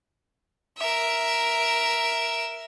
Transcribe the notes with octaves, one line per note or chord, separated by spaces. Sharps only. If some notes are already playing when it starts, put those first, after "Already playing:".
A#4 E5